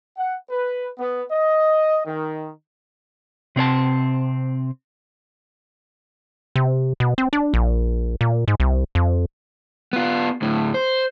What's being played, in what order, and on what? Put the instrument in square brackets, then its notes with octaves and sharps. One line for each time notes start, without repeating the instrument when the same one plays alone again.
[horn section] F#5
B4
B3
D#5
D#3
[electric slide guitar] C3 C4 C#5 A5
[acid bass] C3
B2
C4
D4
A#1
A#2
G#2
C2
F2
[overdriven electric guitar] B3 F4
D2 A2
C5